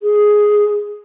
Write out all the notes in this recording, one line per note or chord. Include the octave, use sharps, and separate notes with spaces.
G#4